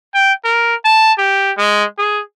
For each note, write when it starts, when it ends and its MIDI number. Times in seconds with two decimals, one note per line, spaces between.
0.14 0.33 79
0.44 0.75 70
0.85 1.13 81
1.18 1.52 67
1.58 1.84 56
1.98 2.22 68